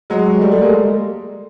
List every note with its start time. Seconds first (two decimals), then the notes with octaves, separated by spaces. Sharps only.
0.10 F#3 G#3
0.41 G3 A3
0.52 G3 A3
0.61 G#3 A#3